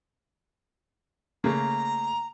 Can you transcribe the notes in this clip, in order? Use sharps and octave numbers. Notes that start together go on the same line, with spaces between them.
C#3 A3 A#3 A#5